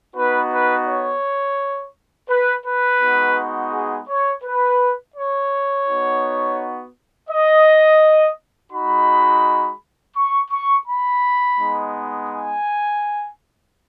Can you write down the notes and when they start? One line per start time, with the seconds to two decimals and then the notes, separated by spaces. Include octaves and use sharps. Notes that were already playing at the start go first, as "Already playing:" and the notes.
0.15 B3 D#4 F#4 B4
0.51 B4
0.87 C#5
2.30 B4
2.65 B4
3.01 G#3 B3 D#4 F#4
3.73 G#4
4.08 C#5
4.44 B4
5.15 C#5
5.87 B3 D#4 F#4
7.30 D#5
8.73 G#3 D#4 F#4 B5
10.16 C#6
10.51 C#6
10.87 B5
11.58 G#3 B3 D#4
12.30 G#5